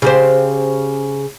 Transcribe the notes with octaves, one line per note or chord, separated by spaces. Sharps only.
C#3 G4 C5